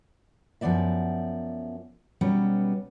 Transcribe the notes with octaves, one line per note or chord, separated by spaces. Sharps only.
F#2 F3 F#3 B3 D5 E5
B2 F#3 G3 B3 C#4